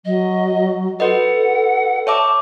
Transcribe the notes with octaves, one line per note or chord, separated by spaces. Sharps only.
F#3 D#5
F#4 A4 B4 D#5 F#5
C#5 E5 A5 D6